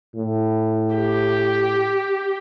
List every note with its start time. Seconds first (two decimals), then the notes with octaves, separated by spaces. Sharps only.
0.16 A2
0.96 G4